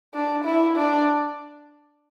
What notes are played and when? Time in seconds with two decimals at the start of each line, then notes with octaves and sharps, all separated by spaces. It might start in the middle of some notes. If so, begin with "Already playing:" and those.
0.14 D4
0.45 E4
0.76 D4